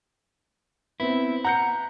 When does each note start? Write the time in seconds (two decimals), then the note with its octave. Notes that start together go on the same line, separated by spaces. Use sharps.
1.00 B3 C4 E4
1.44 F#5 A#5 G6 C#7